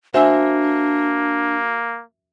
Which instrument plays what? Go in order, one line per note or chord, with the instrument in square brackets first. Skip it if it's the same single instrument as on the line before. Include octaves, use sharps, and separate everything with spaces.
[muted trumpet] A#3 [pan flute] D4 [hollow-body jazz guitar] F#4 C5 [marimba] E5 G#5 E6